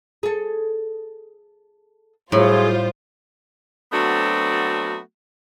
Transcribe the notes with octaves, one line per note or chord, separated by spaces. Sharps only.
G#4 A4
A2 F#3 G3 F4 G#4 C5
F#3 A3 B3 C4 D4 F#4